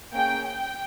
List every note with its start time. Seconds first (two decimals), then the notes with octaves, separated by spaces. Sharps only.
0.13 A#3 C#4 G#4 G5
0.45 G5